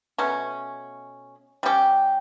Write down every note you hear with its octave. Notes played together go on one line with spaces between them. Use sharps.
B2 A3 C#4
G3 C#4 G4